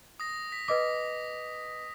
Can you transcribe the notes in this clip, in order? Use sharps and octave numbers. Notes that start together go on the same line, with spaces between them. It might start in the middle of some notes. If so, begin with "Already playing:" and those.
D#6 A#6
B6
B4 D#5 D6 D#6